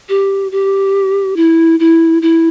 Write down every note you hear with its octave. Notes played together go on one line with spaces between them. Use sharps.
G4
G4
E4
E4
E4